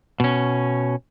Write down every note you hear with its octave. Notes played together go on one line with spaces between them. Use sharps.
B2 C#4